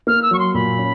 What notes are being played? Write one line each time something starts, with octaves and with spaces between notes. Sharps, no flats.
A#3 F6
E6
F#3 C#6
C6
A#2 B5
C#4